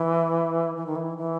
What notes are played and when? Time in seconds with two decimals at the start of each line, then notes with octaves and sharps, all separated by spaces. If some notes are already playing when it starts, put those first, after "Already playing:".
Already playing: E3
0.77 E3
0.86 D#3
0.96 E3
1.18 E3